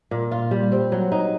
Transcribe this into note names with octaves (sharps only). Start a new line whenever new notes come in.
A#2
F4
G3
C4
F#3
D#4